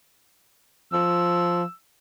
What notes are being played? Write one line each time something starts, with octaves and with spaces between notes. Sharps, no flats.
F3 E6